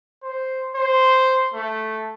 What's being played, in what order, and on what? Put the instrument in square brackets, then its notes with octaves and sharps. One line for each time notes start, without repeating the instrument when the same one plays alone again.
[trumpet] C5
C5
A3